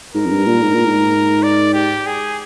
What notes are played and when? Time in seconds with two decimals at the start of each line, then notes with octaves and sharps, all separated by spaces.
0.14 G#2 A#4
0.26 F2
0.30 G2
0.46 A#2
0.62 G#2
0.74 A#2
0.85 G#2
1.43 D5
1.74 G4
2.06 G#4